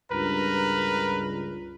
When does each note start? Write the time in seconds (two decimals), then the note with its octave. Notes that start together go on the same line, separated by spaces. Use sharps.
0.12 C#2 G2 A#4 B4